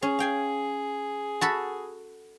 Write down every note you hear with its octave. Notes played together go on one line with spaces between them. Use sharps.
C#4 G#4
F5 G5 G#5
F#4 A4 B5